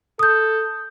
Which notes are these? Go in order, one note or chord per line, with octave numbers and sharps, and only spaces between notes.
A4 D#6 G6